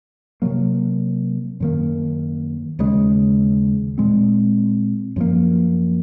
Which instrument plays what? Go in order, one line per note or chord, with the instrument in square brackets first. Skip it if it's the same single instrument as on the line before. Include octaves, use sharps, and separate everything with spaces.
[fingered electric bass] C3 F#3 A#3
F#2 D#3 A#3
D#2 C#3 G#3
A#2 G#3 C4
F#2 F3 A#3